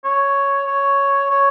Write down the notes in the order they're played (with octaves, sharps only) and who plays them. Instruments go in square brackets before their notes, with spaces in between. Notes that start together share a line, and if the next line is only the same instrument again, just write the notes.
[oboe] C#5
C#5
C#5